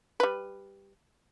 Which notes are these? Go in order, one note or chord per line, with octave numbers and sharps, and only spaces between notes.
G3 B4